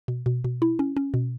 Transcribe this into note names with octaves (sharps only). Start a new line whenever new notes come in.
B2
B2
B2
E4
C#4
C#4
B2